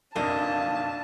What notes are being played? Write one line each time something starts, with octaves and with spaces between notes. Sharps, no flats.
F#1 B1 F2 D3 A#3 D#5 A5